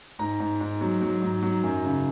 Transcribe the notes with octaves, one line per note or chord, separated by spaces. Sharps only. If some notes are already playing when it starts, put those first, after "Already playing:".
G#2 A#5
G#2
G#2
F#3
F#3
G#2
F#3
F#2
C#3